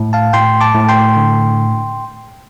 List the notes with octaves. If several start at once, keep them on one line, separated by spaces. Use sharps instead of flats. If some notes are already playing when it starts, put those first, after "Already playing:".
Already playing: A2
F5 A5
A2 G5 C6
A5 D6
A2
G5 C6
D3